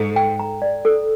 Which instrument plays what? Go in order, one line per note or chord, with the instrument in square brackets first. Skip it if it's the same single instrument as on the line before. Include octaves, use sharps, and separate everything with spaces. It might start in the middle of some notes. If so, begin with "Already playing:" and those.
Already playing: [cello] G#2 [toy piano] A4
[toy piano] G5
A#5
D5
A4